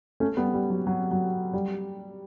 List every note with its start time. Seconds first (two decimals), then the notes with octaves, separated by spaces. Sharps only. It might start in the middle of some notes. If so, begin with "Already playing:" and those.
0.20 A3 C#4
0.37 G3 B3
0.54 G3
0.70 F#3
0.87 F#3
1.11 F#3
1.54 G3